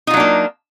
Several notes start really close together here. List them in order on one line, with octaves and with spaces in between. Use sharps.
D#4 F4 F#3 D4 A#3